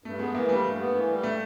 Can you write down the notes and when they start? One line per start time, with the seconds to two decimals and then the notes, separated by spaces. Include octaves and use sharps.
0.04 G2 A3
0.19 G#3 B3
0.35 E3 A#3
0.49 G3 A3
0.64 G2 A3
0.79 B3
0.94 E3
1.09 G3
1.23 A3